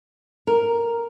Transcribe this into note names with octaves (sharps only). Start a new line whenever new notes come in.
A#4